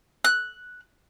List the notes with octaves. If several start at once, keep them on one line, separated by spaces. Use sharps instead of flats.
F#6